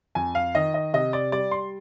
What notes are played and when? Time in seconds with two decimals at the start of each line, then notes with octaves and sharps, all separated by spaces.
0.15 F2 G#5
0.35 F5
0.55 D#3 D#5
0.74 D#5
0.93 C3 D#5
1.13 D5
1.32 G3 D5
1.51 C6